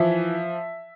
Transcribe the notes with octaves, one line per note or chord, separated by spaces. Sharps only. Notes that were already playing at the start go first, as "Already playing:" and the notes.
Already playing: E3 F3 E5